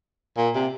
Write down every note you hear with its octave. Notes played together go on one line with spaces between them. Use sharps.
A#2
C3